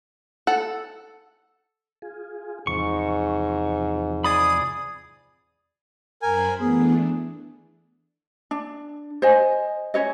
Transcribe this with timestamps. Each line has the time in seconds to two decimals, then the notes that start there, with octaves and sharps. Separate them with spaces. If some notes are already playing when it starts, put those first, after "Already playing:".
0.47 A4 F#5
2.02 F4 G#4
2.67 E2 G#2 C3 F3 C#6
4.24 G#4 D5 B5 D#6
6.22 F#2 A#4 C5 G#5 B5
6.60 E3 A3 B3 D4 G#4
8.51 D4
9.22 C5 D#5 G#5
9.94 C#4 F4 C#5 D#5